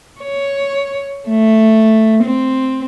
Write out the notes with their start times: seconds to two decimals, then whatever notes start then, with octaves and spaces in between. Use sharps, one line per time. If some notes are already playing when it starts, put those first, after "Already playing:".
0.21 C#5
1.29 A3
2.24 C4